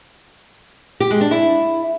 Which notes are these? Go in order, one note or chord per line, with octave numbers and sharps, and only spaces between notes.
G4
G#3
D4
E4